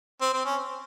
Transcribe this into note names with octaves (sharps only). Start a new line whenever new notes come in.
C4
C4
C#4